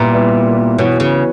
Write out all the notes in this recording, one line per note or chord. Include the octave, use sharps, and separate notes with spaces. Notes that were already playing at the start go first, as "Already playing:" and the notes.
Already playing: A#2 G3 B3 E4 B4
G3 B3 E4 B4
B2 E3 B3 F#4 C#5
C#3